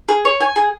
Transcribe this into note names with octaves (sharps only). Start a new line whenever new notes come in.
G#4
C#5
G#5
G#4